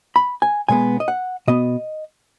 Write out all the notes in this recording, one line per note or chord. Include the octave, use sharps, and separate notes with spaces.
B5
G#5
B2 G#3 B3 G#5
D#5
F#5
B2 B3 D#5